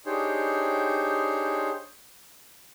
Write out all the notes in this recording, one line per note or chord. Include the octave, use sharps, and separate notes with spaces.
D4 D#4 G4 G#4 C5 C#5